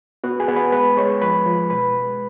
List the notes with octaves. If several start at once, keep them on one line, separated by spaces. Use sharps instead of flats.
B3 F#4 F#5
G#4 G#5
B3
B4 B5
G#3 B4 B5
G#3 C#5 C#6
F3 B4 B5
F3
B2 B4 B5
G#3